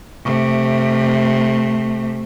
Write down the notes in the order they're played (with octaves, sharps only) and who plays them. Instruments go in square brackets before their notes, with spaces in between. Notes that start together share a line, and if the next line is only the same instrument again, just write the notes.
[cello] C3 A3